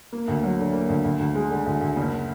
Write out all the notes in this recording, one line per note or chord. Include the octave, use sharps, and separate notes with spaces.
A#3
D2
F#3
D3
A#3
D2
D2
D2
G#3
D3
D2
D2
F#1